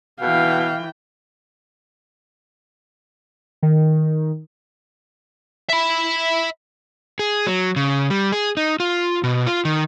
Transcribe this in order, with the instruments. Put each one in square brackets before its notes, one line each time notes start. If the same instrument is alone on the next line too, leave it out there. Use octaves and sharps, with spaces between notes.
[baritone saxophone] B2 [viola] E3 G5 [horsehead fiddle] F5
[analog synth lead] D#3
[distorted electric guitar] E5 B5
[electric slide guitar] G#4
F#3
C#3
G3
G#4
D#4
F4
B2
F4
D#3